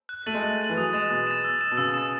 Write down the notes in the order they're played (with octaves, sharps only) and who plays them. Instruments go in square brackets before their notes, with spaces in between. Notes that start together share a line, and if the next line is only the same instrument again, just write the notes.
[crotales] F#6
[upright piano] A3 [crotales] A6 D#7 F#7
[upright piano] G#3
[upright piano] A3 [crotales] F#6
[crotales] A6 D#7 F#7
[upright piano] E3
[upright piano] F#3 [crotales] D#6
[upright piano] G#3 [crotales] A6 E7
[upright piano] B2 [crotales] D#6
[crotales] A6 E7
E6
A6 E7
[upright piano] B2
[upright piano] C#3 [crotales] E6
[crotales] A6 E7